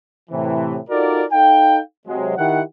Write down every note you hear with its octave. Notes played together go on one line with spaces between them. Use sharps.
A2 C3 E3
D#4 F4 F#4 A4 A#4 D5
D#4 A4 F5 G5
C3 F#3 G#3
D#3 E4 G4 F#5